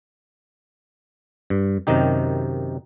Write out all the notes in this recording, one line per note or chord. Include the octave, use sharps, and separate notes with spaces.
G2
F#2 C3 D#3 D#4 G4